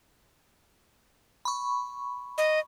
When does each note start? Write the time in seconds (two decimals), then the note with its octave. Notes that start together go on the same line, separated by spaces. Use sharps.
1.45 B5 C#6
2.38 D#5